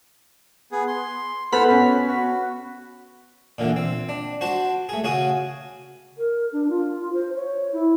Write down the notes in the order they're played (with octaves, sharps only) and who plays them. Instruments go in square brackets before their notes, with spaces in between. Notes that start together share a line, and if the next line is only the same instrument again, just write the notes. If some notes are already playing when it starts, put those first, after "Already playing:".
[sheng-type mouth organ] B3 G#4
C6
[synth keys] B3 B5 B6 [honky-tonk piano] A4 [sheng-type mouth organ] C5 F#5 F6
[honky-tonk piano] C#4 [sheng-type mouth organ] F#4
[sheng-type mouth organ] F#4
[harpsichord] A#2 D3 E3
C4
D4
F#4 C5 A5
A3 G#4
C#3 F#4 G#4 D#6
[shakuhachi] A#4
D4
F4
C5
C#5
E4